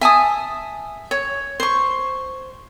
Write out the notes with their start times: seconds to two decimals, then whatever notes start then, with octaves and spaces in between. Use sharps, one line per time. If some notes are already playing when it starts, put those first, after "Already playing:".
0.01 E5 G#5 A5 D#6
1.11 C#5
1.60 C5 C#6